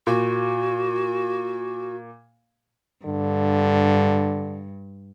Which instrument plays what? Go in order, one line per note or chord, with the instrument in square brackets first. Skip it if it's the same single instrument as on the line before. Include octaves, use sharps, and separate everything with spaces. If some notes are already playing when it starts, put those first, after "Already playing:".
[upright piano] A#2 [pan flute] F#4
[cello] G2 [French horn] D3